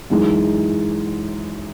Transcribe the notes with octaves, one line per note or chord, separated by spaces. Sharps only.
F#2 E3 G#3 D#4